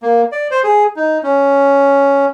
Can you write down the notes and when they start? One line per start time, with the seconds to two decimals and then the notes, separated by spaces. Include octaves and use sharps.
0.02 A#3
0.32 D5
0.51 C5
0.64 G#4
0.96 D#4
1.23 C#4